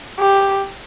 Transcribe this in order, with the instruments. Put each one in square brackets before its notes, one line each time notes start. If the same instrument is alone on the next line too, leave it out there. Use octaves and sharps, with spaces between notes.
[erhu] G4